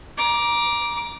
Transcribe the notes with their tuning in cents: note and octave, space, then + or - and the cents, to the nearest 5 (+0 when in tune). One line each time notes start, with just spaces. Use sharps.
A#5 +25 D6 +0